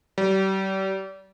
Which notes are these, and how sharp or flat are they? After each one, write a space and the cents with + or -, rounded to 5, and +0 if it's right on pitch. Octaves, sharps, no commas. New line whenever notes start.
G3 -35